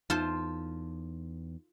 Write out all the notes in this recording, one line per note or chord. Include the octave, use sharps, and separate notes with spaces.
E2 D#4 F4 A4 C5